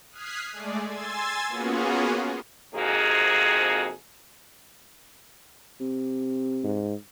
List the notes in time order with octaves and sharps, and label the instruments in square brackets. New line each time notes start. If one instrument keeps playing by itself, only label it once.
[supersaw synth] D#6 F6 F#6 G#6 B6 C7
G#3 A3 G#4 D5
G#5 C6 E6 G#6 A6
A#3 B3 C#4 F4 F#4 G#4
[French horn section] F2 G#2 C3 A#3 F#4 G#4
[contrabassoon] C3
[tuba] G#2